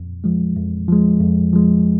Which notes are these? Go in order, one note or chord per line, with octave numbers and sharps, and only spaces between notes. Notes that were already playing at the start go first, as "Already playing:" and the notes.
Already playing: F2
F3 G#3
F2
F3 G#3
F2
F3 G#3